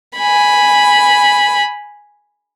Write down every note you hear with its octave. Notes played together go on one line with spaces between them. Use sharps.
G#5 B5